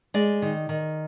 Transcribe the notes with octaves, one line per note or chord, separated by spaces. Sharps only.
G#3 D5
D#3
D#3